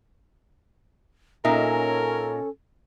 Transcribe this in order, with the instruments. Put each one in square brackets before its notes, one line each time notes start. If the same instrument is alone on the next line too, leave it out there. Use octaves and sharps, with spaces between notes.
[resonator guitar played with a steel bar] A#2 D#4 E5 [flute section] C#4 A4 [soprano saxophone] A#4